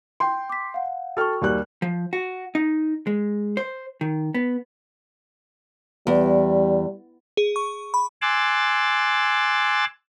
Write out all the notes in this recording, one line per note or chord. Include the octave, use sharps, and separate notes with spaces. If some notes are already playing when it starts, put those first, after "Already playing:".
G5 C6
D6 B6
F5 F#5
F#4 A4 G5 C#6 F6
D#2 G3 F#6
F3
F#4
D#4
G#3
C5
D#3
B3
E2 G3
G#4
C#6
B5
G#5 C6 D6 E6 F#6 A6